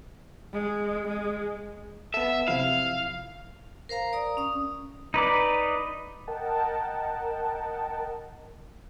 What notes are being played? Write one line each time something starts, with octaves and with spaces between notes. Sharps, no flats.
G#3
G#3
B3 A4 E5
C3 F3 E4 F5
A#4 C5 F5 A#5
D5 A#5 D#6
C#4 D#6
D#4 B4 D5
A#4 D#5 F#5 G5 A5